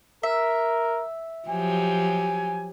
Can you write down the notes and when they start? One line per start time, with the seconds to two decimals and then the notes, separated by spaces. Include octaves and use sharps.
0.23 A#4 E5
1.49 F3 F#3 G4 G#5